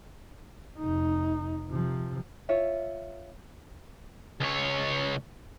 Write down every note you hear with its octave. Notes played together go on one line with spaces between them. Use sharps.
F1 D#4
C3 F3
F4 C#5 E5
C#2 C#5